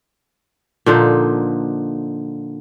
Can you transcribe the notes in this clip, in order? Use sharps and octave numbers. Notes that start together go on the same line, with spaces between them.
A#2 D3 F3 D#4